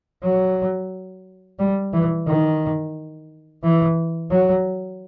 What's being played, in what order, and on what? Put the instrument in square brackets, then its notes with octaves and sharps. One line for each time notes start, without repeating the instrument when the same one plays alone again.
[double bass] F#3
G3
E3
D#3
E3
F#3